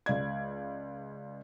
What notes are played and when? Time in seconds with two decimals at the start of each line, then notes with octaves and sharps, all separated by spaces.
0.06 C#2 D5 G#6